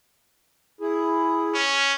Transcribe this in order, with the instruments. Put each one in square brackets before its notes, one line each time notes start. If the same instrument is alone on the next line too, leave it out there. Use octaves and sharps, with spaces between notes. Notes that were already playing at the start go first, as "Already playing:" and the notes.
[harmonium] E4 G#4
[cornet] C#4